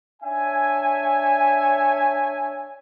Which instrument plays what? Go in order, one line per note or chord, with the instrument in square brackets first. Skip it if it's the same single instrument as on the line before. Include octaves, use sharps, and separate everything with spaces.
[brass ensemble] D4 C#5 E5 G#5